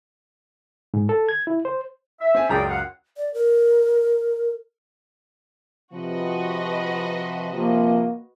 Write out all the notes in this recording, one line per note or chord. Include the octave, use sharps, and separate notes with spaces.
G#2
A4
G#6
E4
C5
E5
C4 G#5
C#2 F#2 G#4 D5 G5 A#5
F5 F#5
D5
A#4
C3 F3 F#4 B4 D#5
C3 F3 A#3